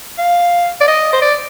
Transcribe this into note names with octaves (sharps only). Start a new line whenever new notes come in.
F5
D5
D#5
C5
D5